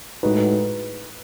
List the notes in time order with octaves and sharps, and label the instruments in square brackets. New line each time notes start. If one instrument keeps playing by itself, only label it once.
[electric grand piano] A2 G#3 D#4 F#4 [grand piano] B4